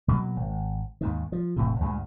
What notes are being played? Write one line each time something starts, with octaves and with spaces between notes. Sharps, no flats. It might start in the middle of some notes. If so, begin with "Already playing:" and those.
B2 F#3 G#3 A#3
G#1
D#2 G#2 D#3
F3
E1 A2 C3
D2 G2 A#2 G#3